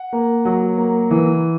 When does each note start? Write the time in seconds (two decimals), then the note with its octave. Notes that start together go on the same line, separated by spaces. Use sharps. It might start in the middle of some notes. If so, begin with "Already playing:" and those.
Already playing: F#5
0.13 A#3
0.45 F#3
0.77 A#3
1.11 E3